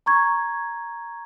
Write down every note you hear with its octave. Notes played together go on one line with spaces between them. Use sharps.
A#5 C#6 G#6